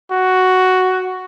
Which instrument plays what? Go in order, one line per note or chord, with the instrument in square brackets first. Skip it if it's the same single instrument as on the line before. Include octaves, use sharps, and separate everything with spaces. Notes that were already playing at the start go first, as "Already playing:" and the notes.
[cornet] F#4